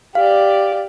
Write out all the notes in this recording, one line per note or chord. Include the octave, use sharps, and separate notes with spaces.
G4 D5 F5